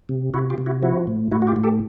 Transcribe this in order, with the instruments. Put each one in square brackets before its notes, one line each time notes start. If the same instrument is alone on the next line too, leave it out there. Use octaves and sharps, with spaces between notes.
[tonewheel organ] C3
C3 E4 F#4
F4 G4
C3
E4 F#4
F3 E4 F#4
A2
A2 E4 F#4
F#4
F4 G4
A2
G4 A4